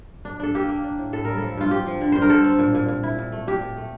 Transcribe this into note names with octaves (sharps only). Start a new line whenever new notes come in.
D4
D4 A4
A#3 G4
A#3
D4
A2
A2 A4
G3 A#4
A4
F3
G2 F4
C4 G4
F3
D3
G2 C5
A#4
D3 A4
C4
A#2
A#2
A#2
E4
A#2
A3
A#2 G4
A#2
A3